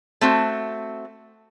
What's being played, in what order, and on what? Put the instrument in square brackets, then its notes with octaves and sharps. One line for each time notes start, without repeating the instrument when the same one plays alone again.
[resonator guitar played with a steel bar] A3 C4 F#4